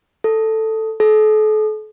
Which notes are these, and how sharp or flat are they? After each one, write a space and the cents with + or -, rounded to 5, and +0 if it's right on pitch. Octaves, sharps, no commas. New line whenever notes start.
A4 +5
A4 -40